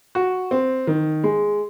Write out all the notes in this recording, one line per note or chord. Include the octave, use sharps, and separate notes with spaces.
F#4
C4
D#3
G#3